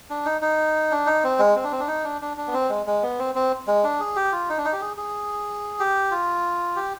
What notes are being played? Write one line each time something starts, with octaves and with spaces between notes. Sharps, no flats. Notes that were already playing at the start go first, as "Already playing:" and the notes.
D4
D#4
D#4
D4
D#4
C4
G#3
C4
D4
C4
D4
D#4
D4
D4
D4
B3
C4
G#3
G#3
B3
C4
C4
G#3
D4
G#4
G4
F4
D#4
D4
D#4
G4
G#4
G#4
G4
F4
G4